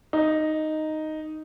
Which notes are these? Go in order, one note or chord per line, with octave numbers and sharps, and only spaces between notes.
D#4